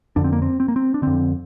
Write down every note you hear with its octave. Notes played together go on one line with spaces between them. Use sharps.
F2 D3 D4
C4
A#3
C4
C4
A#3
C4
D4
F2 D3 C4